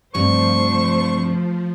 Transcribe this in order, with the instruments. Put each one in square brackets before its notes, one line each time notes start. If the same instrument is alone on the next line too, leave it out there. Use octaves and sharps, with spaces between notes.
[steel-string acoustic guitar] G2 C3 [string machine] F3 [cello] A3 C5 [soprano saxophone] C#6